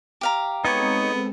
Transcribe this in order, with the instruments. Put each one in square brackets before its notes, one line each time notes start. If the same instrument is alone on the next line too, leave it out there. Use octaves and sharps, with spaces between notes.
[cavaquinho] G4 F5 A#5
[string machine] G#3 C4 A4 [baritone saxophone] B3 [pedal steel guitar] D#4 C#5